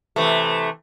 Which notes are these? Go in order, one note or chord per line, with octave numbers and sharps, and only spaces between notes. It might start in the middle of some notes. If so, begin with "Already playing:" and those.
C3 E3 A3